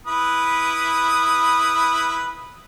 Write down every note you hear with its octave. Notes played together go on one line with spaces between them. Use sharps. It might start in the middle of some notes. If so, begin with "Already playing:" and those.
E4 B4 D#6